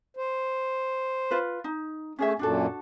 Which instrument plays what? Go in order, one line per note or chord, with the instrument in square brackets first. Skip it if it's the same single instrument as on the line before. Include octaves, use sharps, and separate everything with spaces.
[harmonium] C5
[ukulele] F4 B4
D#4
[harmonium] A3 [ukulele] C#4 G#4 E5
[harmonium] F#2 A#2 [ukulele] D4 F#4 A4